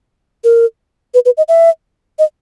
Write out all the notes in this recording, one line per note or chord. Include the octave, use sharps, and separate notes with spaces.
A#4
B4
B4
D#5
E5
D#5